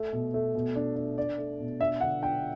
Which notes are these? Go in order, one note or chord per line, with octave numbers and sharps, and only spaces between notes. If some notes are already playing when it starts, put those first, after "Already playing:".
Already playing: A3
B2
A3
B2
D4
D4
D4 D5
A3
B2
D4 E5
D3 F#5
D4 G5